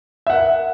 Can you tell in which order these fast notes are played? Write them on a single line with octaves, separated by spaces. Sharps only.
E5 F#5 A#4